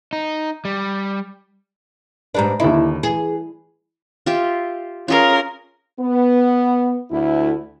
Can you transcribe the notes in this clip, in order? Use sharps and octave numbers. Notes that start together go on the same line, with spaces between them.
D#4
G3
G#2 G3 D4 B4 A#5
D#2 D3 D#4 E4
E3 G#4
F4 G4 E5
C#4 F4 G#4 A#4 F5
B3
D2 E4